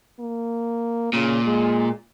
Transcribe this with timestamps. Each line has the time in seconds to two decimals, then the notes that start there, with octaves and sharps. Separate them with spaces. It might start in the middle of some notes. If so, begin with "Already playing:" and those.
0.20 A#3
1.13 A#2 C#3
1.46 G#3